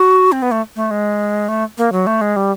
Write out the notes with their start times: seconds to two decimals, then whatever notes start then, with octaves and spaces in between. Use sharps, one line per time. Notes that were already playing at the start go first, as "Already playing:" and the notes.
Already playing: F#4
0.32 C4
0.42 B3
0.51 A3
0.76 A3
0.91 G#3
1.48 A3
1.78 A#3
1.92 F#3
2.07 A3
2.21 G#3
2.36 G3